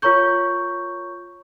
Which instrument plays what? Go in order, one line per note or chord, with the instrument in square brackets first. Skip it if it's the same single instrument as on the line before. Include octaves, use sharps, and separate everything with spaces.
[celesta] F4 A#4 C#5 A#5 C#6 G6